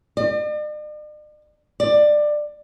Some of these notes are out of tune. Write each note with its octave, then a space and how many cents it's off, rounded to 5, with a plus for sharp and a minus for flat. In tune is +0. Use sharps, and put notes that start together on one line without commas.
D5 +45
D5 +20